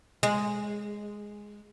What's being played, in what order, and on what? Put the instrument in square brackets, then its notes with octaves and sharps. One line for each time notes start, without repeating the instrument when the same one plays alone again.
[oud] G#3